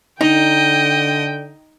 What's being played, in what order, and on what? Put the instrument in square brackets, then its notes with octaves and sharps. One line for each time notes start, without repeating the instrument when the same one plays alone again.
[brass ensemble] D3 [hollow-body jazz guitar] D#4 [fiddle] D#5 [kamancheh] G5